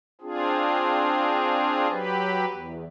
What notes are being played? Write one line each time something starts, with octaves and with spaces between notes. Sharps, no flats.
C4 D4 F4 G#4
F#3 G4 B4
E2